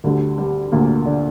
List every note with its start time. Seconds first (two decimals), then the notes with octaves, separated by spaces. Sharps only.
0.04 D2 D3 G3
0.38 G3
0.72 D2 A#2 D3 A#3
1.06 D3 D4